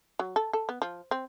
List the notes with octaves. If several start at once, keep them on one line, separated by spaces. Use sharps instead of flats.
F#3
A4
A4
B3
F3
C4